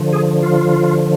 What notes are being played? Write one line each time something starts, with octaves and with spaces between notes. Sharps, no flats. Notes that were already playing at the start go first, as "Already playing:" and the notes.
Already playing: D3 F3
G#4
F4